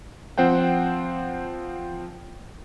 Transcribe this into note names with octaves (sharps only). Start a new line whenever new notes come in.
F3 C4 C5 F#5 G5